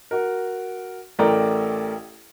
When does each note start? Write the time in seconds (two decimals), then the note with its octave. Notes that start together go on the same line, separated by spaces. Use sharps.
0.11 F#4 A#4
1.19 A1 A3 A#4 D5 G5 A#5